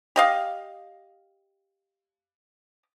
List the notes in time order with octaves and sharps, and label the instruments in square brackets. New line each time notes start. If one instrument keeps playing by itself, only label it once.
[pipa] G4 D#5 F5